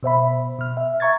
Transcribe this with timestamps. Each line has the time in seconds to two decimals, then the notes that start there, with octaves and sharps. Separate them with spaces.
0.03 B2 C5 E5 B5
0.59 B2 F6
0.77 E5
1.00 E5 A#5 C#6 G#6 A6